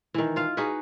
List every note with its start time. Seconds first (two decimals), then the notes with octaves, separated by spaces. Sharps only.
0.14 D#3 E3
0.36 F4 F5
0.57 D#4 F#4 G#4 B4